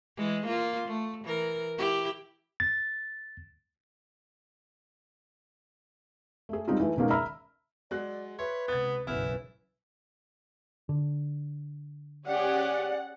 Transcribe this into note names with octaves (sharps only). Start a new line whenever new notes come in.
E3 G#3
A#3 F4
A3
E3 A#4
E4 G4
A6
A3 G#4
G3 G#3 C4 D#4 F4
E3 A3
B2 D#3 G#3 A#3 C#4
E5 A#5 B5 E6 F6
F#3 G#3 D5 F#6
B4 C#5 E5 C6
C#2 C3 B3 G#6 A6
F#1 B1 C#3 E3 B3 E4 F6
D3
C#4 G4 G#4 D5 F#5